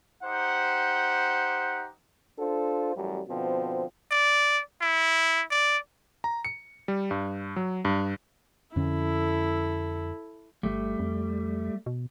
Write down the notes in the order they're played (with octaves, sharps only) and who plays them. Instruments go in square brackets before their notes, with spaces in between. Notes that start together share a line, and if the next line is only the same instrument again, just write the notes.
[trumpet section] D#4 G4 C5 F#5
[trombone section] D4 F4 A4 C5
A1 F#2 G3
B2 D3 F3 C4
[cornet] D5
E4
D5
[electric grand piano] A#5
C#7
G3
G2
F#3
G2
[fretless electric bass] F2 D3 C#4 [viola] E4 A4
[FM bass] G1 [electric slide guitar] G3 A3
[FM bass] F2
B2